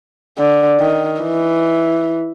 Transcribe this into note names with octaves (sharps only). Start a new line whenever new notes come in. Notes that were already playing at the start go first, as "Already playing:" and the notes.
D3
D#3
E3